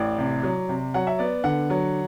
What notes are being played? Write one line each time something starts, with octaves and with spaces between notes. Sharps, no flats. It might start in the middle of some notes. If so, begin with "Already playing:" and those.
Already playing: A1 D5
C3
F#3
C3
F#3 F#5
E5
B3 D5
D3 F#5
F#3